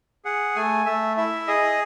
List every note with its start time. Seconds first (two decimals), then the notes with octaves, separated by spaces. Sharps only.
0.25 G#4 F#5
0.56 A3 G#5
0.86 A3 E5
1.17 E4 E5
1.47 G#4 D#5